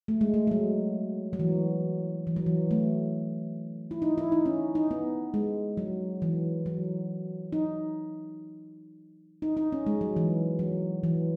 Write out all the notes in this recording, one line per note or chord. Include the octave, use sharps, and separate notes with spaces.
A3
G#3
A3
G#3
F#3
F#3
E3
E3
F#3
E3
A3
E4
D#4
E4
D#4
C#4
D#4
B3
G#3
F#3
E3
F#3
D#4
D#4
D#4
C#4
G#3
F#3
E3
F#3
E3